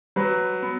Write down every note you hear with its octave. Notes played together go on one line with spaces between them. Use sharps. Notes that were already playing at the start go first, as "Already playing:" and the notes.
F#3 B4
B3